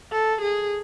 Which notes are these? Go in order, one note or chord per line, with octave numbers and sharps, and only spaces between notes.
A4
G#4